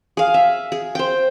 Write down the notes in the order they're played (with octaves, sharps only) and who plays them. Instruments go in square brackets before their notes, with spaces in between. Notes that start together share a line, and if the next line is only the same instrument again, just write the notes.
[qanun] G#4 F5
E5
G#4
C5 G5